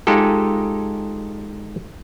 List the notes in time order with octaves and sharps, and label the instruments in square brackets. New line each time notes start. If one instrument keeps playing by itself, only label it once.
[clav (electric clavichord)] G#3 D#4 F4 G4 A4